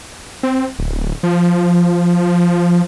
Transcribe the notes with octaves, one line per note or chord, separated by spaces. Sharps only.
C4
D1
F3